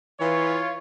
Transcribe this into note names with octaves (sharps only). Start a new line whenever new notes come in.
E3 F4 C#5